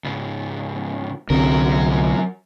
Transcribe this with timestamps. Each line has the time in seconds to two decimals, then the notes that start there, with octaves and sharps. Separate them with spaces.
0.04 C#2 G#2
1.30 C2 D3 F#3 C4 A#4